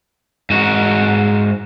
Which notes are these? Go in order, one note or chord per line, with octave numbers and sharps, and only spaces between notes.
G#2 F#4